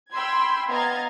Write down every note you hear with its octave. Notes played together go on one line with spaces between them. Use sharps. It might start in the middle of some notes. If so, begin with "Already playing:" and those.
G5 B5 C6 E6 G#6
B3 D#5 F5 A#5 G#6 A6